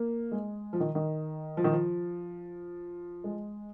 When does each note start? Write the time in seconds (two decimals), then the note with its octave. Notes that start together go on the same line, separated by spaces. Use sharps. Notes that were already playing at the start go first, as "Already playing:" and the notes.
Already playing: A#3
0.32 G#3
0.73 F3
0.80 D#3
0.95 D#3
1.57 F3
1.64 D#3
1.72 F3
3.24 G#3